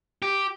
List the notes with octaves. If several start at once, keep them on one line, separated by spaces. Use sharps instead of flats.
G4